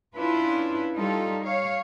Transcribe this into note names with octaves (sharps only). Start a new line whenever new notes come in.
C#4 D4 E4 F4 B4
G3 D#4 F4 A4
C#5 F5